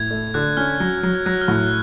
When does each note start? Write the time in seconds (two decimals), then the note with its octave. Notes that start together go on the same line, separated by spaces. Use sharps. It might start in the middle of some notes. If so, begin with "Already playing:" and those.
Already playing: A2 G#6
0.11 A3
0.34 D3 F#6
0.57 C#4 F6
0.80 F#3
1.03 F#3
1.14 G#6
1.26 F#3 F#6
1.42 F6
1.48 A2
1.56 F#6
1.67 F#6